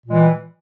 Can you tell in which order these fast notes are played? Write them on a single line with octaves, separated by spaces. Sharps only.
A#2 G#3 E3 G3